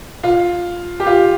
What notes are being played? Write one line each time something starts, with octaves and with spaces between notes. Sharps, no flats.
F4
G4
F4